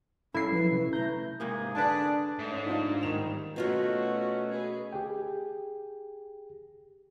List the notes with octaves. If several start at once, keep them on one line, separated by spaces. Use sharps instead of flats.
G3 C#4 E4 A4 C7
F3 F#3 B4
C3 C#4
A3 A#5 G6
G#2 C3 A#3 G#4
D3 D4 B4 A5
G#2 A3
C#4
D4 D#4 F4
D#3 E7 F7
G3
B2 A3 C#4 F4 F#4 A#4
G#4 B4
G4 G#4 G5